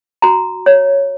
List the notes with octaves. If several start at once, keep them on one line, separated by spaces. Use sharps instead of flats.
F#4 A#5
C#5